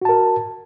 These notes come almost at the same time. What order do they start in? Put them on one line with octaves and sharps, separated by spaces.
F#4 A5 A#4